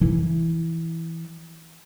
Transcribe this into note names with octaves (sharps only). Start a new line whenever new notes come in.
E3 E4